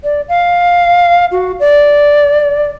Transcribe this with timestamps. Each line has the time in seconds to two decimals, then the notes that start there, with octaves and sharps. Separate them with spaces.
0.04 D5
0.28 F5
1.31 F#4
1.60 D5